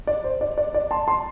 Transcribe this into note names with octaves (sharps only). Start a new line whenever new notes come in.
D5
C5
D5
D5
D5
A5 C6
A5 C6